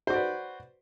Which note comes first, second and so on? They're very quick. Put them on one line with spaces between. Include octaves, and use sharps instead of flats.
C5 F#4 D5 B4